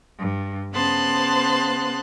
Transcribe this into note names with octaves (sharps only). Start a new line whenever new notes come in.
G2
C#3 B3 C5 A5 C6 F#6